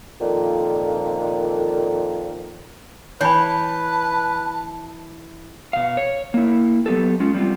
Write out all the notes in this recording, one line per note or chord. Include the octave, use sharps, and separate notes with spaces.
F2 A#2 D3 D#3
E3 B4 C#5 A5 B5
B2 F5
C#5
A#3 E4
F#3 B3 G4 A4
G#3 C#4 F4
G3 C4 F4